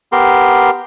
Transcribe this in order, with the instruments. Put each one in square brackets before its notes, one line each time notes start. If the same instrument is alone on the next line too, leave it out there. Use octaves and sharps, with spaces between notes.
[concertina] B3 G4 A#4 C6